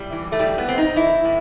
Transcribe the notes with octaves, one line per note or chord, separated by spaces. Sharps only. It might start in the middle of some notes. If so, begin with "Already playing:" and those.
Already playing: A2 G3
E3
A3
A2 G3
B3
A2 C4
D#4
E3 E4
A2